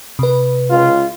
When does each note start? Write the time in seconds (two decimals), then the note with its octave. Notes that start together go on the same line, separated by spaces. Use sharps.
0.19 C3 B4
0.69 C#2 F4